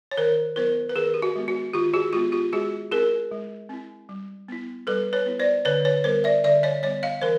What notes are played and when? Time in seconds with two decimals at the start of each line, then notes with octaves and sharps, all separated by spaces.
0.11 C#5
0.17 D#3 A#4 C5
0.56 F#3 B3 E4 A#4 C5
0.89 B4
0.95 D#3 G#4 A#4
1.14 G4
1.22 F#4
1.36 G#3 B3
1.48 F#4
1.73 D#3 F4 G4
1.94 F#4 G#4
2.13 G#3 B3 F4 G4
2.32 F4 G4
2.53 G#3 F#4 G#4
2.91 C4 E4 G#4 A#4
3.31 G#3
3.69 C4 E4
4.09 G3
4.48 B3 E4
4.87 G3 A4 B4
5.13 B4 C#5
5.26 B3 E4
5.39 C5 D5
5.65 D3 B4 C#5
5.85 B4 C#5
6.04 G3 B3 A#4 C5
6.24 D5 E5
6.44 D3 D5 E5
6.63 C#5 D#5
6.83 G3 B3 C#5 D#5
7.03 D#5 F5
7.22 E3 A#4 C5